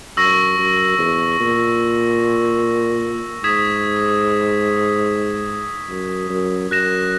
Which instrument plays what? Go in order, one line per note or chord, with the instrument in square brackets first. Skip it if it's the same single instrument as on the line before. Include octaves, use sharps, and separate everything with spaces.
[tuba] F#2 [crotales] C#6 E6 A#6
[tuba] F#2
E2
A#2
[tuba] G#2 [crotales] D#6 G#6 B6 E7
[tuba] F#2
F#2
[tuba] F#2 [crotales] F#6 A#6 E7